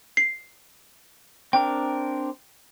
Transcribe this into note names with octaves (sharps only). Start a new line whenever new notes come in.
C7
C4 D4 A#4 G5